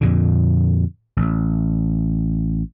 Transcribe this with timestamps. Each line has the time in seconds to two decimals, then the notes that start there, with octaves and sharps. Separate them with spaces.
0.01 F2 A#2 D3
1.17 A1